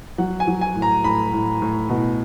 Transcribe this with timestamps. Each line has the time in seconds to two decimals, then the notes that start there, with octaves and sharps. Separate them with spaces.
0.18 F#3 F#5
0.40 G#5
0.47 F#3
0.61 G#5
0.75 A2
0.82 A#5
1.04 A2 B5
1.33 A2
1.62 A2
1.90 B2